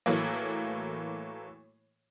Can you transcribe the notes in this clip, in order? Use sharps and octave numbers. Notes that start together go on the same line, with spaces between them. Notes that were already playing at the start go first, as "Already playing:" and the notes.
A2 E3 F#3 A3 A#3